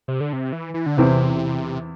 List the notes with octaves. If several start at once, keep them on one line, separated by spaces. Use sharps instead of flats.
C3
D3
C3
E3
E3
D3
E2 C3 E3 C4 E4